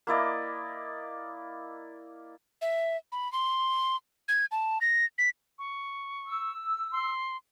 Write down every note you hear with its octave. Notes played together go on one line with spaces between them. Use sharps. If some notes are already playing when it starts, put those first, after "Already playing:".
A#3 E4 D5 D#5
E5
B5
C6
G#6
A5
A#6
B6
C#6
E6
C6